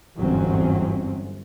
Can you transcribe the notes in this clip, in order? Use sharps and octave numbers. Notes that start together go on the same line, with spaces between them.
G1 E2 G#2 F#3 C4 C#4